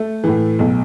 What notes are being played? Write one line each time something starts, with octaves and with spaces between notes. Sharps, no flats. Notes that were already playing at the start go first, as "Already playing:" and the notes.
Already playing: A3 A4
A2 E3
B1